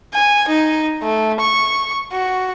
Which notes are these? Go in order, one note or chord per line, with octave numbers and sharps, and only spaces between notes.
G#5
D#4
A3
C#6
F#4